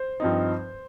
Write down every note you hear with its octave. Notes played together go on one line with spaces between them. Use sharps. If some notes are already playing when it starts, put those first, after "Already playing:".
Already playing: C5
G2 F3 C4 D#4